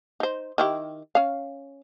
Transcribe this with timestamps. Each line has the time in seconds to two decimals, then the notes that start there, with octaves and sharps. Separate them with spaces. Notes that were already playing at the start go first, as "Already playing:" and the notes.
0.20 D#4 C5
0.58 D#3 E4 G4
1.15 C#4 F5